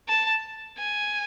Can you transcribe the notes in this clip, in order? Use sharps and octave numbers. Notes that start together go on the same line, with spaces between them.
A5
G#5